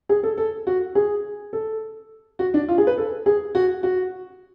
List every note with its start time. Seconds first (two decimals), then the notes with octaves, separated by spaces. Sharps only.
0.09 G#4
0.23 A4
0.38 A4
0.67 F#4
0.95 G#4
1.53 A4
2.39 F#4
2.54 D4
2.69 F4
2.78 G#4
2.87 B4
2.98 A4
3.26 G#4
3.55 F#4
3.83 F#4